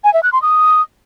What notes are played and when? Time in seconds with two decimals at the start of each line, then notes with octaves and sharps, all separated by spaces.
0.04 G#5
0.14 E5
0.23 F#6
0.33 C6
0.42 D#6